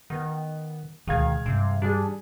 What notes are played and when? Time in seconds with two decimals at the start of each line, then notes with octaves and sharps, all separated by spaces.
0.10 D#3 B3
1.07 D2 B2 D#3 G#3 F5 G#6
1.46 G2 C3 E3
1.82 G3 D4 G#4